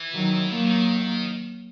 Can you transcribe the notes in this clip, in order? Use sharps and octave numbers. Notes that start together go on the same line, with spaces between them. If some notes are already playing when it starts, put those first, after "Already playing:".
Already playing: E3
D#3 F#3
D#3 F#3 A#3
D#3